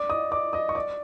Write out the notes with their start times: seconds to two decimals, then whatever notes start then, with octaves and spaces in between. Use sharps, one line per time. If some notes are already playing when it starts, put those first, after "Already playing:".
Already playing: D5 D6
0.09 D#5 D#6
0.32 D5 D6
0.53 D#5 D#6
0.69 C#6
0.75 D5 D6